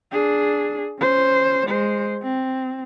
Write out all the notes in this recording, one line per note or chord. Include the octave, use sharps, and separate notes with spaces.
D4 G#4
C#4 C5
G#3 C5
C4